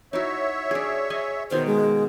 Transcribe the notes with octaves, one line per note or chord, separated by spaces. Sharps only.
D#4 E4 F#4 C#5 E5
D4 G#4
G#4 D#5 G#5
B2 D#3 C5 F5
G#3